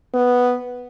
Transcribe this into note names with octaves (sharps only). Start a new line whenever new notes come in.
B3